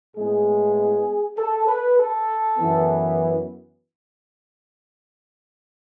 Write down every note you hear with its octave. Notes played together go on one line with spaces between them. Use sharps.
A2 G#3 B3 G#4
A4
B4
A4
F#2 E3 B3